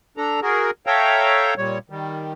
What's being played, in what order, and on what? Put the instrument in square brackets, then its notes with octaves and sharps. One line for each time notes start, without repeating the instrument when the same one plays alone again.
[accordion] D4 A4 A#5
F#4 G#4 A#4
A4 C#5 E5 F5 G5 A#5
A#2 G3 C#5
D#3 G3